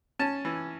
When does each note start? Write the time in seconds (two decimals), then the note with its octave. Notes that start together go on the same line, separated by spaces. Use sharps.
0.19 C#4 A5
0.45 E3